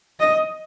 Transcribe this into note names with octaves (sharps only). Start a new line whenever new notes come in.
D#5